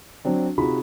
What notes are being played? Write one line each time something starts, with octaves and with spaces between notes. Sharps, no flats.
F#3 C4 D4
C3 D#4 F4 F#4 G#4 B5